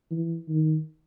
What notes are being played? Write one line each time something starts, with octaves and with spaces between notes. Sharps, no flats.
E3
D#3